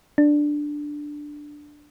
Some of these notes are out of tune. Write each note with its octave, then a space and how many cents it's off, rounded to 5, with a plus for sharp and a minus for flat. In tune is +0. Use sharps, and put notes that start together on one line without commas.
D4 +5